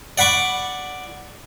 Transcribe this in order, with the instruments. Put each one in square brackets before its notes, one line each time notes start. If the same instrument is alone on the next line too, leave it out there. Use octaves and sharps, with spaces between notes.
[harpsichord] D5 F#5 B5 C#6 D6